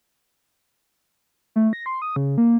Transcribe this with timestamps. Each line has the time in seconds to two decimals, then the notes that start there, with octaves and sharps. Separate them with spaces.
1.56 A3
1.73 A#6
1.86 C6
2.02 D#6
2.16 C#3
2.38 A#3